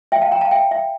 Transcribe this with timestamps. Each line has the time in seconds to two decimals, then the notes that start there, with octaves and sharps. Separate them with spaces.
0.12 E5 G5
0.21 F5 A5
0.31 G5 A#5
0.41 F5 A5
0.51 E5 G5
0.71 E5 G5